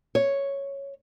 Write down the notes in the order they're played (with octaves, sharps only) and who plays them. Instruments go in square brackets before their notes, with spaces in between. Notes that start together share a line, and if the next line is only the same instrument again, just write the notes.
[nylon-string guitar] C#5